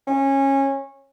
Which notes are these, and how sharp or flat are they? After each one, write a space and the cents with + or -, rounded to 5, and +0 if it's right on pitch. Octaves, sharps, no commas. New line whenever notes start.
C#4 -20